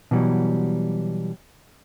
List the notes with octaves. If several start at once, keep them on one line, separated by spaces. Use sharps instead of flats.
B2 E3 F#3 G3